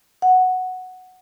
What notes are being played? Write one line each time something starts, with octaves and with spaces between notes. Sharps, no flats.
F#5